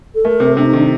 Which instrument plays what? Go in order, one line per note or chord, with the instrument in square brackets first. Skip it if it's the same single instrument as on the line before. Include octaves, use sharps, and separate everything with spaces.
[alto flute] A4
[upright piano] A3 [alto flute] A#4
[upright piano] C3
[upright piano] C3 [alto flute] D4
[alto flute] D#4
[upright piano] D#3 [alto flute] D4